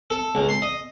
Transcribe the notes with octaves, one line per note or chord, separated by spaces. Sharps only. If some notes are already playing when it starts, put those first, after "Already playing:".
A4
C#2
C6
D#5